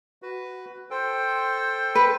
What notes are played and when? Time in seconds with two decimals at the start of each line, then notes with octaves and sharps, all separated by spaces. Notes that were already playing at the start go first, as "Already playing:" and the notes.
0.22 F#4 B4
0.91 A4 C5 G5
1.95 B4